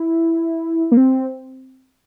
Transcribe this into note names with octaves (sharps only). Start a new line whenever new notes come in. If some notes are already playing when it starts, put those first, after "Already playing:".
Already playing: E4
A#3
C4